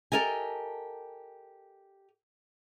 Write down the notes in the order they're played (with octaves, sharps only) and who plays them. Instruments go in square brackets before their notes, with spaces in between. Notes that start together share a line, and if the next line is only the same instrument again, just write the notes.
[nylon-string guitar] G4 A4 A#4 D#5 G#5